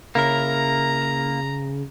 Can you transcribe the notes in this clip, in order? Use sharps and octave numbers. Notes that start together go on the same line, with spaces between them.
C#3 A#3 E4 A#4 A#5